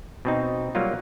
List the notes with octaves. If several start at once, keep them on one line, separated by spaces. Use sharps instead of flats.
B2 C4 D#4
F#3 G3 A#3 F4